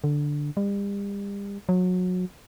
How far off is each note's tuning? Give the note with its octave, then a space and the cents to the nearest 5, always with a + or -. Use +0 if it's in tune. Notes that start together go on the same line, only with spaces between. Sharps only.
D3 +0
G3 +40
F#3 -25